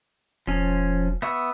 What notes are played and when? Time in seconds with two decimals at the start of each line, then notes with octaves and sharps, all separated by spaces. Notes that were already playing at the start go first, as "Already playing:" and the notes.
0.47 E1 F3 C#4
1.22 B3 E5 C#6